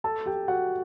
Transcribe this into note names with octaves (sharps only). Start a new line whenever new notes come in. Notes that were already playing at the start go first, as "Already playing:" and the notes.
A4 A5
G4 G5
F#4 F#5